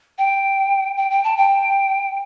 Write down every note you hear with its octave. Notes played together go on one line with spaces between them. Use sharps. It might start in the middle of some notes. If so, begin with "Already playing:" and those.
G5
G5
G5
A5
G5